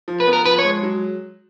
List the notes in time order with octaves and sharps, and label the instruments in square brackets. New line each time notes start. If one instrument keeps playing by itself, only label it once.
[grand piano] F3
[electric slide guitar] B4
[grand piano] B3
[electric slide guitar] A#4
[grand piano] F3 [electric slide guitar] B4
[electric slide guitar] C#5
[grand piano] G#3
F#3